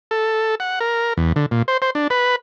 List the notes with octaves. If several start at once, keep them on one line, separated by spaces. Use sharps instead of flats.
A4
F#5
A#4
E2
D3
A#2
C5
C5
D4
B4